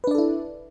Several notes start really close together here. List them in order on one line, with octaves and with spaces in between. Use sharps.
B4 D4 D5 A4 E4